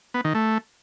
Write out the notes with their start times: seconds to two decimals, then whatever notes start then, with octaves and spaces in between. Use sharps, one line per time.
0.14 B3
0.24 D#3
0.35 A3